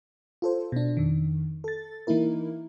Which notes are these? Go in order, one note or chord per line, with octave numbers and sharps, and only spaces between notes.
F4 A4 C5
B2 D4
F2 D#3
A4 A6
E3 A#3 D#4 E4 A#4